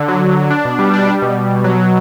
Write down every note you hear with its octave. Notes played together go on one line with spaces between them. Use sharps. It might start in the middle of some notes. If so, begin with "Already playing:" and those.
Already playing: D3
F#3
D3
F#3
D4
B2
G3
D4
G3
B2
G3
B2
F#3
F#3